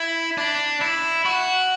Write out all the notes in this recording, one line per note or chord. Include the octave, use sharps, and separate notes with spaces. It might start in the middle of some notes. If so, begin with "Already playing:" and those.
Already playing: E4
D4
E4
F#4